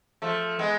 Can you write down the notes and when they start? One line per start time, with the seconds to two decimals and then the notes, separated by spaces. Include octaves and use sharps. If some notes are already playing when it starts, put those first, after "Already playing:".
0.22 F3 A3
0.59 G#3 B3